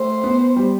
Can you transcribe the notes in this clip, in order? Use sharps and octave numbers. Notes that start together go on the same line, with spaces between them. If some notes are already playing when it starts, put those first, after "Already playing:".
Already playing: A3 C5
B3
G3